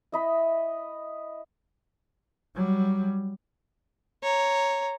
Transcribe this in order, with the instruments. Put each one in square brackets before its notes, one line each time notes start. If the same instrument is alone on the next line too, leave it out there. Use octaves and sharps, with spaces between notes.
[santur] E4 D#5 B5
[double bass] F#3 G3
[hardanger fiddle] C#5 A#5